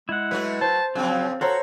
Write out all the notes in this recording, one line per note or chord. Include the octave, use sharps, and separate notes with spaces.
G#3 E4 F#5
F#3 A3 F#4 B4
C5 A5
C#3 F3 F#3 C4
F#4 A4 C5 C#5 A#5